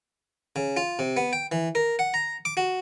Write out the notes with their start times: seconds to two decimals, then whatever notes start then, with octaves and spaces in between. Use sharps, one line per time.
0.56 C#3
0.77 F4
0.99 C3
1.17 B3
1.33 G5
1.52 E3
1.75 A#4
1.99 F#5
2.14 A#5
2.45 D6
2.57 F#4